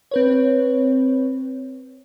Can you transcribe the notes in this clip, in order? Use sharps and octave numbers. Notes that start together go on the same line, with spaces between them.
C4 B4 C#5